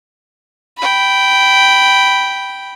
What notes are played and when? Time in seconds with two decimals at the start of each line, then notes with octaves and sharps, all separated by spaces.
0.78 G5 B5